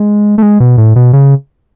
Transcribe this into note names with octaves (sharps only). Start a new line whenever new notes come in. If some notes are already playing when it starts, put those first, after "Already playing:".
Already playing: G#3
A3
G#3
B2
A2
B2
C#3